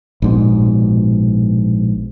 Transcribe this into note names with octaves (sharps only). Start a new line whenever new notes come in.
A#1 G#2 B2